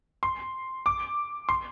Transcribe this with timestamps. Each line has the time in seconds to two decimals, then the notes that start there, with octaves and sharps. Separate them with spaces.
0.23 C6
0.86 D6
1.49 C6